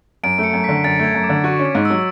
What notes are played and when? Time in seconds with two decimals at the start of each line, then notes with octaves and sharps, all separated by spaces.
0.24 F#2 D7
0.38 A3
0.44 C#7
0.53 F#2
0.64 B6
0.69 D3
0.84 F#2 A6
0.99 A3 G#6
1.15 F#2
1.24 D6
1.29 D3
1.44 F#4 C#6
1.59 C#4
1.65 D6
1.75 G#2
1.85 E6
1.90 F#3